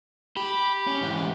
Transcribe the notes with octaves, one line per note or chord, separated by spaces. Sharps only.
G4 B5
C#4
G#2 E3